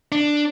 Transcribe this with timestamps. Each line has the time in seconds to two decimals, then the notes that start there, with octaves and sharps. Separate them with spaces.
0.12 D4